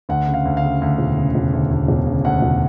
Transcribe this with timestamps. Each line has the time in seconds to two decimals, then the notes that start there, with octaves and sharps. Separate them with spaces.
0.09 D2 F#5
0.27 C#3
0.34 F5
0.45 D2
0.57 F5
0.63 C#3
0.82 D2
0.98 E1
1.18 C#3
1.35 E1
1.53 D2
1.71 D2
1.88 E1
2.07 C#3
2.25 D2 F#5
2.42 E1